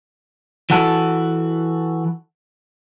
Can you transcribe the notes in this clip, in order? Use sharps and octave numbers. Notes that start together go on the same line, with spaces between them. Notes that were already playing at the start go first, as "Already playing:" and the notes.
E3 F#4 A4